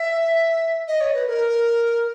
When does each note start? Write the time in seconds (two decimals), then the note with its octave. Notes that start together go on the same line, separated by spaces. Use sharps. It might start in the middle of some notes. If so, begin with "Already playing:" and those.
Already playing: E5
0.88 D#5
1.01 C#5
1.14 B4
1.27 A#4